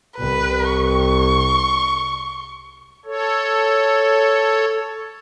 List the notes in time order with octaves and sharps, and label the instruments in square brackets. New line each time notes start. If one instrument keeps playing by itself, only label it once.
[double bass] C2 [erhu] B4
[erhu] C#6
[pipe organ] A4 C#5